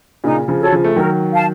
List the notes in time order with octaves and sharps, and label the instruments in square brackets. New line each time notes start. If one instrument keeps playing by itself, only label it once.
[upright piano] A#2 C#3 [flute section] D#4
[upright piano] C#3 F3
[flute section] F#4 A4 C#5
[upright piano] C#3 F3
A3
[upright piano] D#3 F#3 [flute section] A#4
[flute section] F5 A5